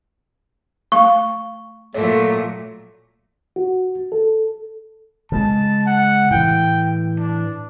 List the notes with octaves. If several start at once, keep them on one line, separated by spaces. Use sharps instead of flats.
A3 F5 C#6
A#2 F#3 A3 C#5
F#4
A4
C#3 G#3 A5
F#5
A2 E3 G5
D4